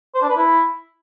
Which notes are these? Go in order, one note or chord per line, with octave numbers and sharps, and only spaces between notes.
C5
D4
B4
E4